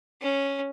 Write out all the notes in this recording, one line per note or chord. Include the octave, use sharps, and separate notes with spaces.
C#4